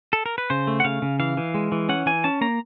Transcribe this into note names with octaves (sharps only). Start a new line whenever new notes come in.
A4
A#4
B4
C#3 C5
A3
F#5
C#3 F5
C#3
E3 F5
E3
G#3
E3
C#4 F#5
E3 G#5
C#4 A5
A#3 A#5